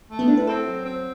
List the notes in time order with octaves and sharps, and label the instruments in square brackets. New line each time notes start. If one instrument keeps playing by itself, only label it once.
[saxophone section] A3
[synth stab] B3
[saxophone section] A2 [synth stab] D4
[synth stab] B4
[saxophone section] C4 [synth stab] A4
[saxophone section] F#3
C4